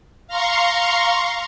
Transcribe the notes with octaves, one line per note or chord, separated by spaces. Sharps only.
F5 A#5 C6 C#6